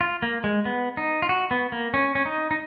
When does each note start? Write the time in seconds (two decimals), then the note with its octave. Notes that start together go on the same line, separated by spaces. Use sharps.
0.01 F4
0.22 A#3
0.44 G#3
0.65 B3
0.97 D#4
1.22 F4
1.29 F#4
1.51 B3
1.72 A#3
1.94 C#4
2.15 C#4
2.25 D#4
2.51 D#4